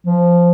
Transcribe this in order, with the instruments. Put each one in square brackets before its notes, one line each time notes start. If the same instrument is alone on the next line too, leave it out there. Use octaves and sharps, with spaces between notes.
[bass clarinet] F3